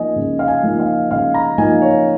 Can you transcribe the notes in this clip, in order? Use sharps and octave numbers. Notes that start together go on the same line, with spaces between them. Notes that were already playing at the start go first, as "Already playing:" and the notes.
Already playing: F3 A#3 D#4 D#5 G#5
C#3
F5
G#5
F3 A#3 D#4
F5
C#3 F5
A#5
F3 A#3 D#4 G#5
C#5